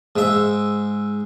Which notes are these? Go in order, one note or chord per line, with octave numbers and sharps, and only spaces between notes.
G#2 E5